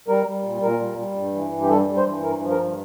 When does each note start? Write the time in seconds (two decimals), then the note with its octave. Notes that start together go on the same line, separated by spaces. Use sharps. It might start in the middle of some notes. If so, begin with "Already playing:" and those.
0.08 G3 A#4
0.26 G3
0.44 A#2
0.62 A#2 A#4
0.80 G3
0.98 G3
1.16 G2
1.34 E3
1.52 G2
1.62 G4
1.69 G3 A4
1.88 G2
1.97 C5
2.06 E3
2.24 G2 A#4
2.41 F3
2.51 A#4
2.60 G2